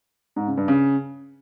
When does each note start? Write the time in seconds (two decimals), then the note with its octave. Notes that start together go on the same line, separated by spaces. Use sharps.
0.36 G#2
0.47 C#3
0.57 G2
0.68 C#3